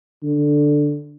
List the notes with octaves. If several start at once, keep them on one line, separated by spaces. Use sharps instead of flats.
D3